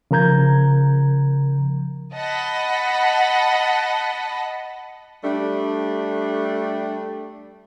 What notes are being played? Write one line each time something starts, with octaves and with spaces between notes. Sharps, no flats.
C#3 F3 A#4 A#5 G6 G#6
D#5 F#5 A5 B5
G3 A3 D4